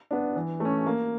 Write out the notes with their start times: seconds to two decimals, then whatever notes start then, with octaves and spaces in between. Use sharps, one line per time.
0.11 B3 D4
0.36 E3
0.60 A3 C#4
0.86 A#3